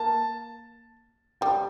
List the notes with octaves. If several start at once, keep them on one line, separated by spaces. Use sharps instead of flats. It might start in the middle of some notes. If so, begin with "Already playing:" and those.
Already playing: A#3 A5
G3 G5